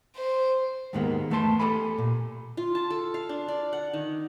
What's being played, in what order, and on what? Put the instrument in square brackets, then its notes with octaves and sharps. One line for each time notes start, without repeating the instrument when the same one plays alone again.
[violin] C5
[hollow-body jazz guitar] D#2 G#2 D#3 G#3 A#3 B3
E2 A3 B4 A5 C6
G4 A4 G#5 B5
A#2
[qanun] F4
A5
A4
F5
D4
D5
F#5
D#3